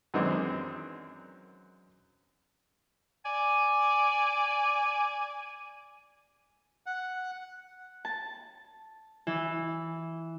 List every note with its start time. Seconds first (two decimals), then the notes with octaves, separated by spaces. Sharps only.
0.14 F#2 D#3 E3 G#3 C4 D4
3.25 D5 G#5
6.86 F#5
8.05 A5
9.27 E3